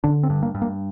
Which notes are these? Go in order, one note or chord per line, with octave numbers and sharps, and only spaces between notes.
D3 D4
C4
G2
A#3
G2
A#3